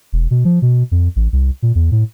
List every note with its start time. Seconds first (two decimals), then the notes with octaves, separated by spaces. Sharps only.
0.13 E1
0.31 B2
0.45 F3
0.62 B2
0.91 F2
1.16 A1
1.33 C2
1.62 A#2
1.75 E2
1.92 A2